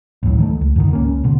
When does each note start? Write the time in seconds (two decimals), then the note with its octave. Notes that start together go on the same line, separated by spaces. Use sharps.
0.23 A1 D2 A2 F#3
0.38 D#3 F#3 A3
0.61 C#2
0.76 F2 G#2 D3 D#3
0.91 C#2 A#3 C#4
1.24 E1 B2 D3